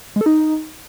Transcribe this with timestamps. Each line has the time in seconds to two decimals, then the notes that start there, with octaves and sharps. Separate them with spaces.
0.16 G#3
0.21 A4
0.26 D#4